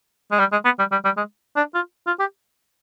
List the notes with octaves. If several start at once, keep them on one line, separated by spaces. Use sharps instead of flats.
G#3
G3
G#3
B3
G3
G3
G3
G#3
D4
F4
F4
G4